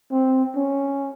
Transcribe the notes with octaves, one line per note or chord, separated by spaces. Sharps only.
C4
C#4